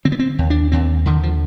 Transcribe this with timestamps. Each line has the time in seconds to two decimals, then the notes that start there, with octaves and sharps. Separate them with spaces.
0.05 D3 C4
0.12 B3
0.19 C4
0.39 D#2
0.50 D4
0.72 D#2 C4
1.06 D3 D#3
1.23 F3